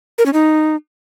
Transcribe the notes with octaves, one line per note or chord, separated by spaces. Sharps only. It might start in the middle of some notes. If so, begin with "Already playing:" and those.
A#4
C#4
D#4